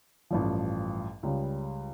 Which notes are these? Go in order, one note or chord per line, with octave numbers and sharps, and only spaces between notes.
A1 G2 F3
C#2 C#3 G3